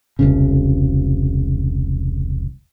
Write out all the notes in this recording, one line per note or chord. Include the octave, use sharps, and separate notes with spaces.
E1 C2 C#3